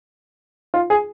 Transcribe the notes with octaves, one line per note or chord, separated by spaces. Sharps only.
F4
G#4